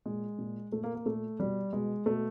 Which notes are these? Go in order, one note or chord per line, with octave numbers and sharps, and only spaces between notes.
A#2 G#3
A#2
A#2 A3
A#3
A#3
A#2 A3
B2 G3
B2 G#3
B2 A3